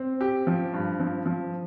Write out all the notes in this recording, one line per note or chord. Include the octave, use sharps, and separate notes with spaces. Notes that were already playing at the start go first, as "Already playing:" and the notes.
Already playing: C4
G4
F3
G2
F3
F3